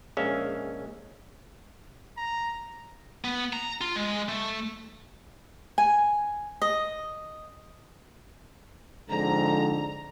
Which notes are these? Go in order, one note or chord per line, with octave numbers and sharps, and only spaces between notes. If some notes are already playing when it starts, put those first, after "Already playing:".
A#1 G#3 C#4 E5 F5
A#5
B3
A#5
F4
G#3
A3
G#5
D#5
F2 G#2 D3 A#5